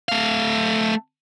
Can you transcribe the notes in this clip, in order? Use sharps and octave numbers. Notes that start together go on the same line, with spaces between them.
A3 F5